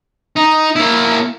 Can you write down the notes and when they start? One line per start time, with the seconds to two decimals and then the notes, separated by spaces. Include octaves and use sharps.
0.36 D#4
0.76 A#3 E4